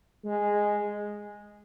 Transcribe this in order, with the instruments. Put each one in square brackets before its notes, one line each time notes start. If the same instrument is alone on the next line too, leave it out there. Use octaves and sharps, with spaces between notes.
[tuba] G#3